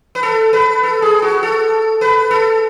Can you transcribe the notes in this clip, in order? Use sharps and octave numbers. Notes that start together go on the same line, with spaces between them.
B4
A4
B4
A4
G#4
F#4
A4
B4
A4